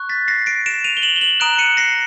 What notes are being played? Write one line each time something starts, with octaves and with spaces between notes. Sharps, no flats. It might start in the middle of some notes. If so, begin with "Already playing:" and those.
Already playing: C#6 F#6
A6 B6
A#6 C7
C7 D7
D7 E7
D#7 F7
G7
E7 F#7
G7
E7 F#7
A#5 D#6 F#6 D7 E7
C#7 D#7
A#6 C7